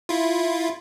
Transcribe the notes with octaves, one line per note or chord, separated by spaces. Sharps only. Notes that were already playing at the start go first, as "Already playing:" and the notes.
E4 F4